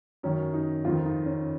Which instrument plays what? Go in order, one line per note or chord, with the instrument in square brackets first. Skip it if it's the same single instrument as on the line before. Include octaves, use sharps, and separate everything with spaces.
[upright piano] F#2 D#3 C#4
D#4
F2 D#3 F4
D#4
C#4